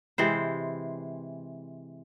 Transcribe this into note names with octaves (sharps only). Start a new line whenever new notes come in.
C3 E3 G#3 C5